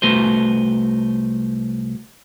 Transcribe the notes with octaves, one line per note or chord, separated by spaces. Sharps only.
C2 A3 F#4 B4 C5